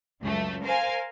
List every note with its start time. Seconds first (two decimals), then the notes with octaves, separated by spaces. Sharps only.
0.22 C#2 F#2 A3
0.63 A#4 C5 F5 G#5